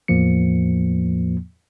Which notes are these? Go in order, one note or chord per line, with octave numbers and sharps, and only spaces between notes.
E2 A2 F3 A#3 C#7